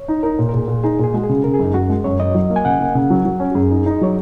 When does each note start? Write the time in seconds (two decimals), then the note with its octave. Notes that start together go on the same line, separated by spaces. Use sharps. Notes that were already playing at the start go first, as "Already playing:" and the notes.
Already playing: C#5
0.08 D#4
0.23 D#4 A#4
0.39 A#2
0.49 A#4
0.53 A#2 G#4
0.68 A#2
0.83 D#4 G#4
0.99 A#2 G#4
1.14 G#3 F#4
1.24 G#4
1.29 C#3
1.44 C#3 A#4
1.54 G#4
1.59 F#2 D#4
1.74 F#2 F#4
1.90 G#3
2.04 F#2 C#5
2.20 F#2 D#5
2.35 F#3
2.50 A#3
2.56 G#5
2.65 C#3 F#5
2.79 A#3
2.95 C#3
3.10 F#3
3.25 F#3
3.40 C#4
3.52 F#4
3.55 F#2 G#4
3.71 D#4
3.86 D#4 D#5
4.01 F#3 C#5